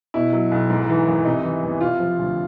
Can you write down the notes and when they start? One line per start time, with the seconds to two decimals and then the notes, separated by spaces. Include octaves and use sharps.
0.14 B2 E4
0.33 F#3
0.52 B1
0.70 G#2
0.89 E3
1.07 G#1
1.25 C3 D#4
1.44 E3
1.63 E2
1.81 C3 F4
2.00 F3
2.19 D2